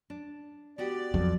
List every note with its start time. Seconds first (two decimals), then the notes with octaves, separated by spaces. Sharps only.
0.10 D4
0.78 B3 F#4 G4 D5
1.14 F2 F#3